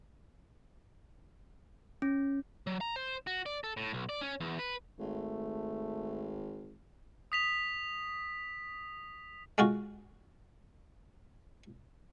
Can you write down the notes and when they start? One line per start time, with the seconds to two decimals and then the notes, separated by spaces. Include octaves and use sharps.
2.02 C#4
2.67 F#3
2.81 A#5
2.96 C5
3.27 F#4
3.46 D5
3.64 A4
3.77 A2
3.93 B1
4.09 D5
4.21 C#4
4.41 E2
4.59 B4
4.99 G#1 A3
7.32 D#6 B6 F7
9.58 G#3 F4 F#4